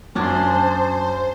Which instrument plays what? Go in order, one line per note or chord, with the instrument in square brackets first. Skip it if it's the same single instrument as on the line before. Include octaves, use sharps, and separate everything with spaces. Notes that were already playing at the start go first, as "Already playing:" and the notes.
[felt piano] F#2 G#6 [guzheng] C#4 D4 D5 [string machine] C5 [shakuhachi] A5